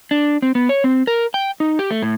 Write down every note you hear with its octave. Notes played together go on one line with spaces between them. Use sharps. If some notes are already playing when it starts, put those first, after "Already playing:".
D4
C4
B3
C#5
C4
A#4
G5
D#4
G4
A3
A2